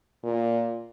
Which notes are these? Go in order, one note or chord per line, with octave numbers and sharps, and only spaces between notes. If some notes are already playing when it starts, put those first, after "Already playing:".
A#2